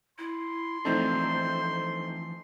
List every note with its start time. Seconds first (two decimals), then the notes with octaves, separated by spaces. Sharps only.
0.18 E4 C6
0.85 E3 F3 A3 C4 D4 D#4 C5